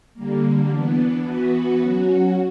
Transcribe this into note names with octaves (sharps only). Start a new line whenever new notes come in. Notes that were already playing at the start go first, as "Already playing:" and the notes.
D3 G3 A#3
E3 B3 D4
E3 B3 F#4 B4
F#3 C#4 F#4